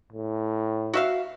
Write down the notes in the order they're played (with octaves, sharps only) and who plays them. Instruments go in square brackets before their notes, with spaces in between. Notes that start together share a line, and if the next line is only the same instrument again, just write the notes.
[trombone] A2
[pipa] F#4 E5 F5